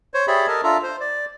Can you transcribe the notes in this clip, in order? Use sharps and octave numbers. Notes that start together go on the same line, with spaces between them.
C5 C#5
G4 G#4 C#5 D5 E5 B5
A4 A#4 D#5 A5
D4 F4 A4 E5 A#5
C5
D5